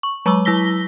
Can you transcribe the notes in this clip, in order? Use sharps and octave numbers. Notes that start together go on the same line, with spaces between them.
C#6
F#3 G#3 A#5 C#6 D6 E6
F#3 E4 E6 A#6 B6 G7